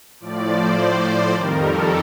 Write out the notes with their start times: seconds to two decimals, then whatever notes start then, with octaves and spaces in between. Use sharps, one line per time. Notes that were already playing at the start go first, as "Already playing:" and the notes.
0.20 A2 F3 D5
0.48 C5
0.77 C5
1.05 C5
1.33 F2 D#3 G3 A#4
1.61 A4